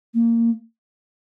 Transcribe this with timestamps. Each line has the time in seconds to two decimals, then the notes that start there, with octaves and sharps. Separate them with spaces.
0.14 A#3